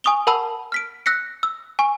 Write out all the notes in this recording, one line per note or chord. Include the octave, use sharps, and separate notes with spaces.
G#5 C#6 D#6 F7 G7
A#4 F#5 A5 B5 E6
F6 B6 D7
E6 F#6 A#6 B6 C#7
E6
G#5 C#6